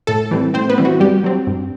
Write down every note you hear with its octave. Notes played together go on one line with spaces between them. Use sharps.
A2 A4 A5
E3 G3 C4
A2 C4 C5
B3 B4
E3 G3 C4
F#4
G2 G3 G4
F#3 C4
G2